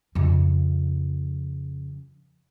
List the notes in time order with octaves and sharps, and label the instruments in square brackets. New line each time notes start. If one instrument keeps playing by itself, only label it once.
[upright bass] F2 C#3